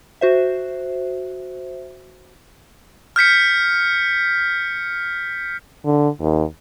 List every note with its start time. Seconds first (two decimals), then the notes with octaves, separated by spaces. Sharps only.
0.21 F#4 C5 E5
3.16 F6 G6 B6 C#7
5.85 D3
6.19 D#2